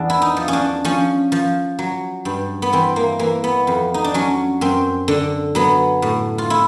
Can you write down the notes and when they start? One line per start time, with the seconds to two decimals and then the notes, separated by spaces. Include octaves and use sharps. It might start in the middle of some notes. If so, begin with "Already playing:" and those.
Already playing: E2 D4
0.10 E4
0.22 D#4
0.37 F3
0.48 C#4
0.53 D4
0.85 F3 C#4
1.32 F3
1.79 F#3
2.25 G2
2.62 B3
2.73 E3 C4
2.96 A#3
3.19 E3 A#3
3.44 B3
3.67 F2
3.94 D#4
4.04 D4
4.14 F#3 C#4
4.61 F#2 C4
5.08 D3
5.55 F#3 B3
6.02 A2
6.38 F4
6.50 E4